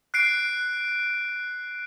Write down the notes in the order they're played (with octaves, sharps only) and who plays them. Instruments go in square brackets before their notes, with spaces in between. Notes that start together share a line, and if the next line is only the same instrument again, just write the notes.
[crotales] F#6 C7 D7